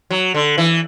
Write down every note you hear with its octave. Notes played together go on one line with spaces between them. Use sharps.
F#3
D3
E3